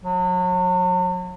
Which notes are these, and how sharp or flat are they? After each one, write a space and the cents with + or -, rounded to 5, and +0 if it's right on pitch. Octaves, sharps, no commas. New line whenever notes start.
F#3 -35